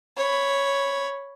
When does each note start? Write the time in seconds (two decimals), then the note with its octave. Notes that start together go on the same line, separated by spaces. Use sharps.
0.17 C#5 B5